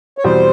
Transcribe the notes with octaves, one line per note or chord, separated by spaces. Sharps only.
C#5
E2 B2 G3 C4 C5